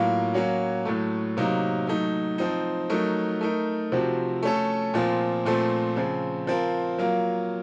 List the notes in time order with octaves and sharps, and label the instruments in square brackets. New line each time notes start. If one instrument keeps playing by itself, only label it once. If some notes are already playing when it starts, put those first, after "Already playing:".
Already playing: [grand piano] A2 F#3 A#3 F4 A#4
F#3 A#3 C#4 F#4
A2 F#3 A3
C3 F#3 A#3 D#4 A#4
F#3 A3 D#4
F3 C4 D#4
F#3 A3 D#4 A#4
A3 D#4 A#4
C3 F3 C4 F#4
A3 C#4 A4
A#2 F3 C4 F4
A#2 F3 A3 C4
C#3 F3 C4
F3 C4 F4 A#4
F#3 A#3 F4 A#4